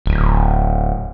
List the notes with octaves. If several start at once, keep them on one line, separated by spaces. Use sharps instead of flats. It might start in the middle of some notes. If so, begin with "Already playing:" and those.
D1